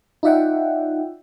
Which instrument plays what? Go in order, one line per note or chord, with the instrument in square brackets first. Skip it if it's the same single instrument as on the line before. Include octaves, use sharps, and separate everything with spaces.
[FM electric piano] D#4 F4 D5 E5 F#5 G5